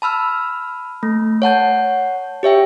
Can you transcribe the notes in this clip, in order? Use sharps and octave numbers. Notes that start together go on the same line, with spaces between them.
A5 B5 E6 F6
A3
C#5 F#5 A5 G6
G4 C#5 E5 G5